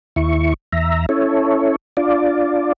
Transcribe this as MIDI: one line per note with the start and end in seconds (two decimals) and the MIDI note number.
0.16 0.54 39
0.16 0.54 64
0.16 0.54 85
0.73 1.06 40
0.73 1.06 76
0.73 1.06 82
1.09 1.76 61
1.09 1.76 64
1.09 1.76 69
1.09 1.76 73
1.97 2.73 62
1.97 2.73 65
1.97 2.73 74